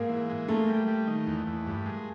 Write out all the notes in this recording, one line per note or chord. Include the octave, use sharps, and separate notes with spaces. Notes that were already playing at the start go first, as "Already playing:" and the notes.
Already playing: G#2 A#3
E3
G#3
A3 A#3
G3
G3
D#3
E2
E2
G2
G#3